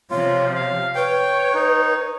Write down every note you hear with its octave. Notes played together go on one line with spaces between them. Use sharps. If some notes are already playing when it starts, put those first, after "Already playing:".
C3 F3 F4 C#5
F5
B4 C#5 G5
D#4